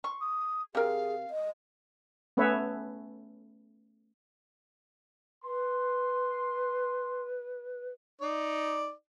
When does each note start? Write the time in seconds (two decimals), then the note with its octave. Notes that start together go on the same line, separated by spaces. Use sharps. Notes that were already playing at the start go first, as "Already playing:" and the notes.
0.04 C6 C#6
0.21 D#6
0.75 C3 G#4 A#4 F5
1.30 D#5
2.37 A3 B3 C#4 B4 C#5 E5
5.44 B4 C6
8.21 D#4 D5